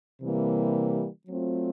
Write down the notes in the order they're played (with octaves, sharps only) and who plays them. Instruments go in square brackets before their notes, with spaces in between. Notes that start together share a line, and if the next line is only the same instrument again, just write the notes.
[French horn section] C3 E3 G3 A#3
F#3 A3 C4 F4